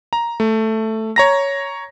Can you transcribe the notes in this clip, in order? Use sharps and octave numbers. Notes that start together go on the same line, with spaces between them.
A#5
A3
C#5 A#5 A#6